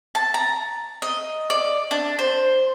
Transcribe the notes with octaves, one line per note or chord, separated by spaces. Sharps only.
A5
A#5
D#5
D5
D4
C5